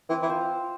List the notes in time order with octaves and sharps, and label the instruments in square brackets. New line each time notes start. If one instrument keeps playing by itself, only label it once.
[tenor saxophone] E3 [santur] C4
[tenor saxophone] E3
[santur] F4 C5 F5